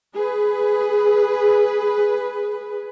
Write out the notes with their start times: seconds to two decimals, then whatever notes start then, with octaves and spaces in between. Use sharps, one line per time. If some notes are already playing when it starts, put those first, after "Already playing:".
0.14 G#4 B4